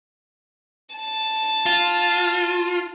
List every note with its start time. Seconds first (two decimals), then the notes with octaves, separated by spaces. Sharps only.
0.95 A5
1.66 F4